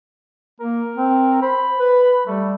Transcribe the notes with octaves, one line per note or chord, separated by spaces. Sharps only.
A#3 A#4
C4
C5 B5
B4
G3 A3